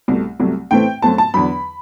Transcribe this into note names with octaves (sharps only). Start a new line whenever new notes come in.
C2 B2 A3
C2 C3 F#3 A3
A2 E3 A3 C4 G5
F#2 F#3 A3 C4 A5
A5
E2 D3 F#3 B5